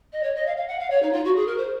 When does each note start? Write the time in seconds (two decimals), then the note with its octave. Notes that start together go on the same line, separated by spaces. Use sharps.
0.13 D#5
0.23 C#5
0.35 D#5
0.46 F5
0.57 F5
0.68 F#5
0.79 F5
0.90 C#5
1.02 D#4
1.12 F4
1.25 F#4
1.36 G#4
1.47 A#4
1.58 C5